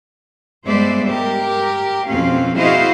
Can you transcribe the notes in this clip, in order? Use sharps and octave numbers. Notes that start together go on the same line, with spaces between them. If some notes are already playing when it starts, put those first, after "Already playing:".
G2 G#3 B3 C5 D5 E5
G4 A#4
F2 B2 C4 C#4 F5
E4 F#4 G#4 C5 D#5 F5